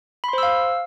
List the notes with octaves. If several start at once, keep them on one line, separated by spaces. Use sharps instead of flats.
C5 F5 B5 C6 E6